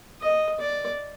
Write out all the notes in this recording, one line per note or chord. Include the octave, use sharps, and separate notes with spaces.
D#5
D5